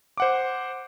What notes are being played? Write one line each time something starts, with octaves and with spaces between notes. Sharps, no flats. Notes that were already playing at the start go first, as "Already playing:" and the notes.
C5 F#5 D6